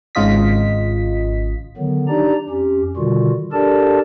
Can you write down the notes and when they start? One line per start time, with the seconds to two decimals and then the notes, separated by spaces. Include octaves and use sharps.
0.15 G#1 C#3 F4 D#5 B6
1.77 D3 D#3 F#3 B3
2.08 D4 D#4 G4 D5 A#5
2.49 F2 C#4 G4
2.97 B2 D3 D#3 G3 F4 F#4
3.52 D4 G4 A4 A#4 D5 A5